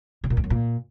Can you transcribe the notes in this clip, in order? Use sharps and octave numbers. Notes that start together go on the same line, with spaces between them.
C#3
A#2
E2
F#2
A#2